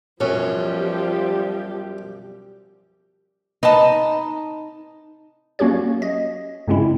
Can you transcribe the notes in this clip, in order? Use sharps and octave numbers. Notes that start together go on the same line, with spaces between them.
B1 F#2 F3 G3 G4 C#5
D#4 B4 D#5 A5
F#3 A#3 C#4 F#4 G4 C#5
D#5
G2 C#3 G#3 C4 C#4 E4